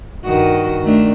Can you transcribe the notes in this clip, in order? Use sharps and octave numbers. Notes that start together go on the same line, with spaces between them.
G2 D#3 F#4
D#3 A3 D4